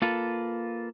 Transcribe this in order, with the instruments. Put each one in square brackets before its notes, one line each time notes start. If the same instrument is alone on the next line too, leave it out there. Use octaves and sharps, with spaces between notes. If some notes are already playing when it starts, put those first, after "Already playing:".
[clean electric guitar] A#3 F4 A4 B4